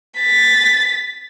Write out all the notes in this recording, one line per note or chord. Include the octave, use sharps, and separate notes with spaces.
A6 B6